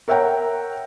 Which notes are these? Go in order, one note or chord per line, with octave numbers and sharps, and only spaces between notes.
A#4 C#5 E5 F#5 G5 A#5